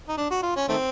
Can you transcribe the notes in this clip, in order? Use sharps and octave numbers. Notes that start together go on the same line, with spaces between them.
D#4
D4
F#4
F4
C#4
D#3 A3 C4